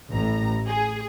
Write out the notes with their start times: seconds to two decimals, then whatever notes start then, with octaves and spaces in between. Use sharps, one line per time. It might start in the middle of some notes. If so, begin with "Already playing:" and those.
0.11 A1 A2 A#5
0.67 G#4